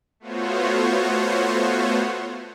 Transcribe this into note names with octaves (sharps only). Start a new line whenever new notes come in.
A3 B3 F4 F#4 C5 C#5